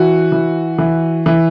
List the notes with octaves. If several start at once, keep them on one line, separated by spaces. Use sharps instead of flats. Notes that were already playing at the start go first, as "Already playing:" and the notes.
Already playing: E3 F#4
E3
E3
E3